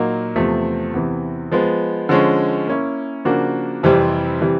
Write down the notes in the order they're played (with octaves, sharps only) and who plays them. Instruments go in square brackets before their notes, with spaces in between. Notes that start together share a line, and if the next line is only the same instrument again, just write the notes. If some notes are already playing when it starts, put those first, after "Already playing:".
Already playing: [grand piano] A#2 F#3 A#3 D#4
E2 C3 F3 A3
E2 C3 E3
F3 G#3 B3
D3 F3 G#3 C#4
A#3 C#4 E4
C#3 F3 A#3 D4 F#4
F2 C3 E3 G3 C4
C3 E3 G3